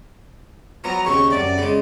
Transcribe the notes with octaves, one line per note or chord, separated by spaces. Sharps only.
F3 F#3 B3 A#5
D#2 C#3 C4 C#6
F#2 C3 D5
C#3 G#3